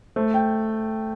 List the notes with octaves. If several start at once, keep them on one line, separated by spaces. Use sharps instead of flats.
A3 C5
G5